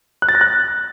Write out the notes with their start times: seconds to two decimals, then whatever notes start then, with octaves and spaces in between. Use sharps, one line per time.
0.22 F#6
0.29 A6
0.35 A#6
0.41 F#6